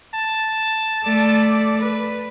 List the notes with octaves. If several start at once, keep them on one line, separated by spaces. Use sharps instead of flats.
A5
A3 D5
B4